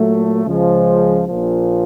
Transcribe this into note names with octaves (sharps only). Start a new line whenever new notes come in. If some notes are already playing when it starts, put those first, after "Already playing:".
Already playing: A#2 F#3 A3
C#2 C#3 F3 G#3
A#1 A#2 F3